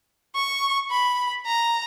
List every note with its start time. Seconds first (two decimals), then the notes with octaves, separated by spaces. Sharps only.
0.35 C#6
0.91 B5
1.46 A#5